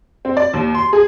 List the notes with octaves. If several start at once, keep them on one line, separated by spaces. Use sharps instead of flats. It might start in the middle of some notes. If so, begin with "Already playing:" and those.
C4
D5
D#2
C6
G#4